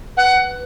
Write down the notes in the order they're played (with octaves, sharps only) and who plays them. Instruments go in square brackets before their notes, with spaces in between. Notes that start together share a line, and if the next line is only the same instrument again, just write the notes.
[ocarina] B4 [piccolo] F#5